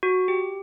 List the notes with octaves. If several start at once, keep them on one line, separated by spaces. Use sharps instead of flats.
F#4
G4